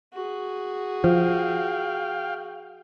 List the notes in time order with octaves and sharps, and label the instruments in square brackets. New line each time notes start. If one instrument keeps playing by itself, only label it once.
[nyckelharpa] F#4 G#4
[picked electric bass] F3 [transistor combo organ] F5 G5